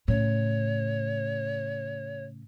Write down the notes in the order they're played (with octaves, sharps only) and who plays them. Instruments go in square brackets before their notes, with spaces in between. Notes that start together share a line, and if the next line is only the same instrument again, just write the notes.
[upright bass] A2 C#3 [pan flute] C#5